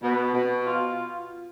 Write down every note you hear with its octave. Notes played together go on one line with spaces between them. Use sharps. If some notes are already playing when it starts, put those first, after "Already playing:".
B2
B2
F4